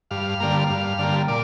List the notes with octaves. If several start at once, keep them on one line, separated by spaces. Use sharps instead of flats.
G2 F5
D3 G3 A#3
G2
D3 G3 A#3
A#2 D5